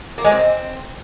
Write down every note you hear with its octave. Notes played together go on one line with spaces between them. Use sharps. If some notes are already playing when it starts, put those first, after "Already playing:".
A#3
G#3
C4